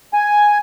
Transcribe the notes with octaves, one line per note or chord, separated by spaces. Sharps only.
G#5